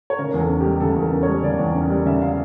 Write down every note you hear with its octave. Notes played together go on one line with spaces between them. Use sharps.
C#5
C#3 A#4
E2
A4
C#4
G4
G3
C#3 A4
E2
A#4
C#4
C#5
G3
C#3 D5
E2
C#4
G3
C#3 E5
F5